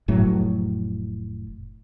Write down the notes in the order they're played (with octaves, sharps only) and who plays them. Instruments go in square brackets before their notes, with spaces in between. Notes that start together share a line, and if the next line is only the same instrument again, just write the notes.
[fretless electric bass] F1 A2 F#3